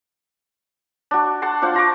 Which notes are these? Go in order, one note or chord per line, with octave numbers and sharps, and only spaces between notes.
D4 F#4
F#5 A5 C6
D4 F4 C5 F#5
F4 A#5 C#6 D6